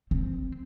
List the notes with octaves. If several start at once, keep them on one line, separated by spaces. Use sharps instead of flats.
C4